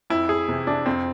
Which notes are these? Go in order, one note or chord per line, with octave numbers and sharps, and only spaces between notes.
F2 E4
G#4
C3 E3
D4
F2 C4